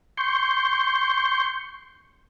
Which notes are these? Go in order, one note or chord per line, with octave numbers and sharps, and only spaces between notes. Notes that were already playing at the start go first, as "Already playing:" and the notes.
C6 C#6 G6